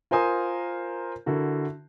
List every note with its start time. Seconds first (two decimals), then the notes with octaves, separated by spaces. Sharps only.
0.11 F4 A#4 C5 G#5 D#6
1.26 D3 E4 F#4 A#4